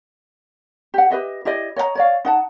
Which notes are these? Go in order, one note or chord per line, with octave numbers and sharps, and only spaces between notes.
G4 F#5
G4 B4 D#5 E5
E4 G4 D5 D#5
C#5 D#5 F5 A#5
C#5 D5 F5
D#4 F#5 A5